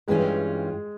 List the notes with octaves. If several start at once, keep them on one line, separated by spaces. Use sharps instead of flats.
G2 E3 G3 G#3 C#4 F4